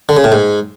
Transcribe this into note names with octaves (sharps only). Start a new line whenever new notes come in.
D3
C#3
A2
G#2